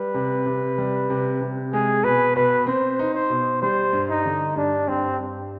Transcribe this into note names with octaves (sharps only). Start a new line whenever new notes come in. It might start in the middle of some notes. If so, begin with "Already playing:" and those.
Already playing: G3 B4
C3
C3
G3
C3
C3
G#3 G#4
B2 B4
B2 B4
C4 C5
D#4
C5
B2
G3 C5
G2
D#4
D3
G2 D4
G2 C4
G2